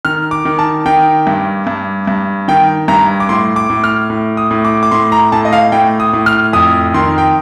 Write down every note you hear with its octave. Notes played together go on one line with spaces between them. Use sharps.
D#3 F6
D6
D#3
A5
D#3 G5
G2
G2
G2
D#3 G5
G2 A#5
D6
A2 C6
D6
A2
F6
A2
D#6
A2
D6
D6
A2 C6
A#5
A2 A5
D#5
F5
A2 G5
D#6
A2
F6
F2 D#6
D#3 C6
G5